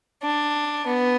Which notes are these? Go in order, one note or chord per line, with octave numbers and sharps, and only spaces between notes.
D4
B3